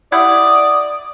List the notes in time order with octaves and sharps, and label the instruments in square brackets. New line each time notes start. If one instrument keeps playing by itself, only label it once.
[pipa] E4 G4 F#5 [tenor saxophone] D5 [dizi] D#6